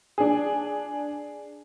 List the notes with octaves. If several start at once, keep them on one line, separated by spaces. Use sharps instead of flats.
D4 G#4